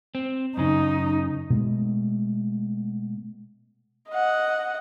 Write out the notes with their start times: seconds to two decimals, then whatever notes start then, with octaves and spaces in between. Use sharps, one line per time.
0.15 C4
0.57 F#2 C#3 D#4
1.50 B2 G#3 A3
4.10 D#5 F#5